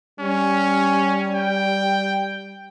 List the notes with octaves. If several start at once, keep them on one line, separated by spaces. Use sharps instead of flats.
G3 C#4
G5